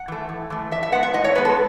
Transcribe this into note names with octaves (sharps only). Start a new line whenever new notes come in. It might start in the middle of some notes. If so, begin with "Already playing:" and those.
Already playing: F#5
E3 A3
A2
E3 A3
A2 E5
E5
G#3 B3 F#5
E5
A2 D#5
C#5
G#3 B3 B4
A4